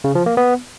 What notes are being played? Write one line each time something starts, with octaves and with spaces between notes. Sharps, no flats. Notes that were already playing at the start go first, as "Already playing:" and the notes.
C#3
F3
A#3
B3